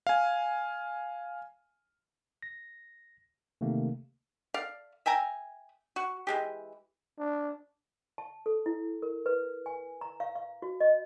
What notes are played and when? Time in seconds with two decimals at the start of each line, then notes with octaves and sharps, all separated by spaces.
0.07 F5 G#5
2.43 A#6
3.61 C3 D#3 A3 A#3
4.54 D5 F5
5.06 E5 G5 G#5 A#5
5.96 F#4
6.27 E3 G#3 G4
7.18 D4
8.18 A5
8.46 A4
8.66 E4
9.02 A#4
9.26 B4
9.66 G#5
10.01 A#5
10.20 F5
10.36 F5
10.62 F#4
10.80 D#5